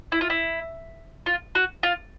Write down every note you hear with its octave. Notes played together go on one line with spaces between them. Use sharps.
E4
F4
E4
F4
F#4
F4